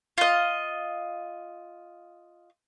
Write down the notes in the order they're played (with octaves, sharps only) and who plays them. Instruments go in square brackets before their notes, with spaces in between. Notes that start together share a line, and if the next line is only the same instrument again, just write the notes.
[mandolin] F4 D#5